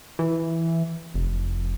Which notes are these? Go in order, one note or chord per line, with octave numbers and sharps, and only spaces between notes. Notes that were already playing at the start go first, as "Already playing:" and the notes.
E3
F1